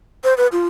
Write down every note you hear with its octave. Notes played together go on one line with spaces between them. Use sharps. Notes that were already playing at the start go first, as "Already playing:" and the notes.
C5
B4
F4